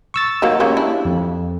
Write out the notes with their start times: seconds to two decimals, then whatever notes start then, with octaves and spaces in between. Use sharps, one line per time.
0.14 C#6 E6 A6
0.42 D#3 F#3 A#3
0.60 G#3 A#3 C#4 G4
0.77 D4 E4
1.05 F2